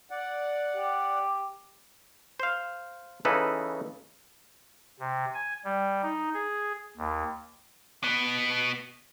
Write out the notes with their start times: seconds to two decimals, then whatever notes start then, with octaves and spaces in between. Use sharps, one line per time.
0.11 D5 F#5
0.76 G4
2.40 C5 F5
3.25 C#3 E3 D#4 A4 B4
4.99 C3
5.34 G#5
5.65 G3
6.03 D#4
6.34 G#4
6.97 D#2
8.04 B2 B3